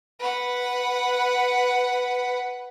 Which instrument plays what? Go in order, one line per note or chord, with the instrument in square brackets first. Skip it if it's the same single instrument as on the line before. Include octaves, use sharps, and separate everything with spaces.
[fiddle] B4 F#5